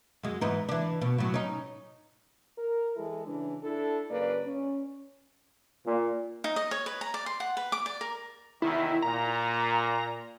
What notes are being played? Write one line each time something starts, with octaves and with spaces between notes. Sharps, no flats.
F#2 G#3
G#2 E3 D#4
E3 D4
B2
A2 F#3
C#4 D#4
A#4
E3 G#3 E4 A4
C#3 E3 D4
D4 E4 A4
F#2 C#3 A#3 B4 D5
C#4
A#2
D#4
D#5
C#5
B4
A#5
D5
C6
F#5
B4
D6
D5
A#4
E2 C3 D#3 E4
A#2 A#5